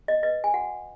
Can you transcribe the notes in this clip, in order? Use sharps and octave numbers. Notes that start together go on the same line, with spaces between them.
D#5
B4 D#5
G#5
F#4 F#5